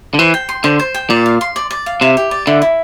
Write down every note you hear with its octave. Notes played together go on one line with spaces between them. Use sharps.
D3
E3 C5
G5
C6
D3 C5
C5
G5
A#2 D5
F5
C6
D5
D5
F5
C3 E4
G4
D5
D3 E4
E4